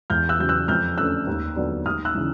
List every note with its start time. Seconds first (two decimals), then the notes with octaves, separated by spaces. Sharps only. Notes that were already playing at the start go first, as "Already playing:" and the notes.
0.10 E2 F6 G6
0.29 E6 F#6
0.39 C#3 F#3 G6
0.49 E6 F#6
0.68 F2 F6 G6
0.98 D3 F3 A3 C#4 E6 F#6
1.27 D#2
1.56 D3 F#3 B3 D4
1.86 D#2 D#6 F6
2.05 E6 F#6
2.15 C#3 E3